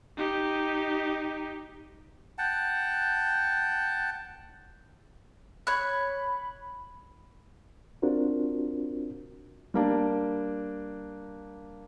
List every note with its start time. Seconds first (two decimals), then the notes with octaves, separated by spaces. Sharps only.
0.17 D#4 G4
2.38 F#5 G5 A5
5.67 C#5 B5 F#6
8.02 C4 D4 F4 F#4 A#4 C5
9.74 G3 A#3 D4